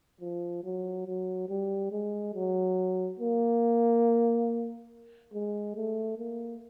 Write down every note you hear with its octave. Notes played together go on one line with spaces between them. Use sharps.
F3
F#3
F#3
G3
G#3
F#3
A#3
G#3
A3
A#3